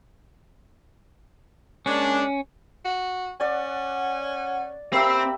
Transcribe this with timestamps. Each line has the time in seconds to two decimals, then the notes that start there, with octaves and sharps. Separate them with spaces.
1.86 G#3 A#3 C#4 D4
2.85 F#4
3.41 C#4 D5 F#5
4.93 A#3 C4 G4 E5 B5